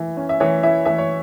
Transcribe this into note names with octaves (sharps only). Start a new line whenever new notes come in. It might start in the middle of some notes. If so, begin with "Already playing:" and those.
Already playing: E3 E4
C#4
E5
E3 C#5
E4 E5
E3 E5
C#5